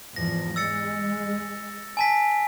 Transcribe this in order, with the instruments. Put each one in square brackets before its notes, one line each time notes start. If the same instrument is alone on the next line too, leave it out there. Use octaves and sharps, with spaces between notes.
[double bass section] E2 G#2 F3 [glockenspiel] A#6
[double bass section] G#3 [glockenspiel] E6 A6 C#7
[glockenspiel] G#5 A5 B6